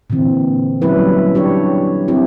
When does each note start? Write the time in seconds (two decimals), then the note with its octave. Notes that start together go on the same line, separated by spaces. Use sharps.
0.10 A#2 D3 E3 C4
0.82 F#3 G3 C#4 E4 B4
1.35 D4 G4 C#5
2.08 C4 E4 G4